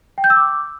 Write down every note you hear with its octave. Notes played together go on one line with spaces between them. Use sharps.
G5
G6
E6
D6